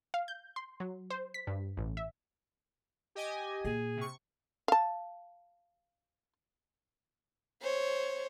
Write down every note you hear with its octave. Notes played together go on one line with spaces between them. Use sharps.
F5
G6
C6
F#3
C5
B6
G2
A1
E5
G4 D#5 G#5
A#2 G#4
C3 C#6
F5 A5
C5 C#5